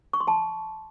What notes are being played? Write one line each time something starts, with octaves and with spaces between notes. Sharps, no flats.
C#6
C6
A5